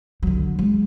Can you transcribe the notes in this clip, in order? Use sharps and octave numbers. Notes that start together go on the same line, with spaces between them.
D3 F#3
G#3